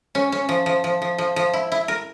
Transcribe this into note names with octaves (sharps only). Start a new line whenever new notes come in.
C#4
C#4
F3
F3
F3
F3
F3
F3
E4
E4
A#4